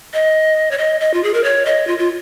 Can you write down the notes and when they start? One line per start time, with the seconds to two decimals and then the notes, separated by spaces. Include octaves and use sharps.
0.14 D#5
0.71 C#5
0.78 D#5
1.00 D#5
1.14 F4
1.24 G#4
1.34 A#4
1.44 C#5
1.65 D#5
1.87 F4
1.98 F4